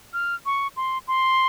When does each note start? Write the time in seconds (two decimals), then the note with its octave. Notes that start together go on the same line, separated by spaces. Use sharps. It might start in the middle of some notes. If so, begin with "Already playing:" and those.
0.13 F6
0.46 C#6
0.76 C6
1.08 C6